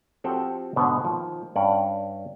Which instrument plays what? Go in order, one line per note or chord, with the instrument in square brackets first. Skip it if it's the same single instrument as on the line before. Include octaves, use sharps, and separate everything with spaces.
[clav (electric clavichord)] F3 C4 F#4 G4 A4
G#2 B2 D3 B3
D#3 F3
G2 C#4 D5 F#5